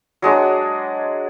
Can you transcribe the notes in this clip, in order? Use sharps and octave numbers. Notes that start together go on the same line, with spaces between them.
F#3 G#3 D4